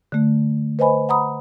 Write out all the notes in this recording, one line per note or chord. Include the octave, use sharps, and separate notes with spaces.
D3 A3
B4 C5 D#5 G#5 B5
F#5 A#5 B5 D#6